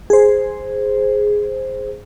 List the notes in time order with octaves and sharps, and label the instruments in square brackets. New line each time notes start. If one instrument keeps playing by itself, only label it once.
[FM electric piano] G#4 C5